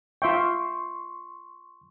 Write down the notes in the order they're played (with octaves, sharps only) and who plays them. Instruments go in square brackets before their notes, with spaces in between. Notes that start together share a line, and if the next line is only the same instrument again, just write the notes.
[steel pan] F4 E5 G5 [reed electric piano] C6 C#6